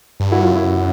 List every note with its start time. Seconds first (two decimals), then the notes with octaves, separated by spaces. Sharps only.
0.20 G2
0.32 E4 F#4
0.43 F#2 F4
0.55 E4